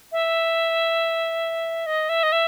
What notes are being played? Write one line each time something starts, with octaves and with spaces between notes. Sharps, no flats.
E5
D#5
E5
D#5
E5